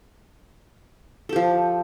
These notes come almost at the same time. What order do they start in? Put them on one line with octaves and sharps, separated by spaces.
A4 G4 F3